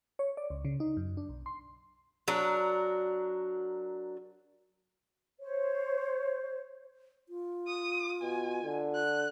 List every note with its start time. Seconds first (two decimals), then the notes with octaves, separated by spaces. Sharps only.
0.19 C#5
0.37 D5
0.50 C#2
0.65 C#3
0.80 D#4
0.97 F#2
1.17 D4
1.29 B1
1.46 C6
2.28 F#3 D4 A#4
5.40 C5 C#5
7.29 F4
7.67 D#6
8.22 B2 G#5
8.63 D3
8.95 F#6